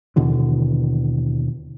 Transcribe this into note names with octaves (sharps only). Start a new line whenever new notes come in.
D#2 B2 D3 E3